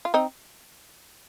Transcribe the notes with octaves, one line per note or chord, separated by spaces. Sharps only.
F4
C4 D#4